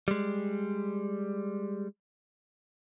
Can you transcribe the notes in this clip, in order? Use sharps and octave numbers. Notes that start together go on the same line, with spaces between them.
G3 G#3